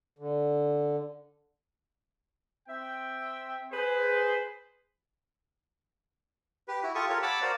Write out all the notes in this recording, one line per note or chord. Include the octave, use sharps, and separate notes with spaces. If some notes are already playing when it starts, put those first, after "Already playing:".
D3
C4 E5 G5
G#4 B4 C5
G4 B4
E4 F#4
F4 G4 A4 C#6 D#6
F4 G4 A4 A#4 C#5
C#5 F#5 A5 B5 D6 E6
F#4 A#4 C5 D5 F5